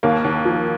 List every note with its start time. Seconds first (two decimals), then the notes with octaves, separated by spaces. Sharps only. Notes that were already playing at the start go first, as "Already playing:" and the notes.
0.03 D#2 A#3
0.24 D#2
0.45 F3